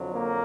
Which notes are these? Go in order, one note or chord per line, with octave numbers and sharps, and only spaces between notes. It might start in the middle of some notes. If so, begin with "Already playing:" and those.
Already playing: F2 D3 F#3
A#3